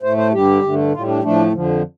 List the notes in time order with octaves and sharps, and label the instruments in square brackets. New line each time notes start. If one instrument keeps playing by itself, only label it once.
[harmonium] A2 A3 C5
C5
G2 D3 G3 G4
G2 D3 A3
A2 G3 F4
D4
A2 F3 A3 D4
F2 D3 F3